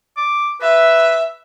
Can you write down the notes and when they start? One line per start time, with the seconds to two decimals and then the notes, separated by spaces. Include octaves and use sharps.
0.17 D6
0.61 B4 E5